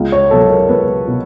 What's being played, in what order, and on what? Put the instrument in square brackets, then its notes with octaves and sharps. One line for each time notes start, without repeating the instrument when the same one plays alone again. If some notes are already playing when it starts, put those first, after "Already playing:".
Already playing: [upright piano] C#2
C#5
B2 F#3 A4
A#4
C#2 B4
B2